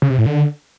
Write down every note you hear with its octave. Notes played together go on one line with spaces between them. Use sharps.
C#3
C3
A2
D3